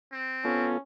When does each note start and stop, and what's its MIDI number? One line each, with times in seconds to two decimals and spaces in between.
0.12 0.67 60
0.45 0.78 59
0.45 0.80 61
0.45 0.78 65
0.45 0.78 69